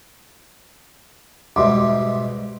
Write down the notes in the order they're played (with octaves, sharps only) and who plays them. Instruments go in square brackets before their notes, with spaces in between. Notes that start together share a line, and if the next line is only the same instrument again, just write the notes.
[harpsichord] G#2 B2 G3 [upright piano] E5 C6 D6